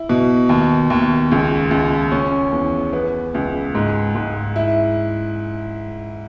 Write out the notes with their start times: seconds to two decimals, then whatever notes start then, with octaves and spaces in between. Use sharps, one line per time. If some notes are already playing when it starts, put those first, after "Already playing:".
Already playing: E4
0.09 B2
0.49 D#2
0.90 D#2
1.31 C#2
1.71 C#2
2.12 C#4
2.52 E2
2.93 B3
3.34 C#2
3.75 G#2
4.15 G#2
4.56 E4